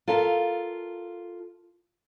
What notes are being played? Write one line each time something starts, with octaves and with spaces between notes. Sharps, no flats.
F4 A4 A#4 E5 F5